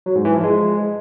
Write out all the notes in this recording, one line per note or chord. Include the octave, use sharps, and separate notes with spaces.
F#3
G#2
E3
F3
G#3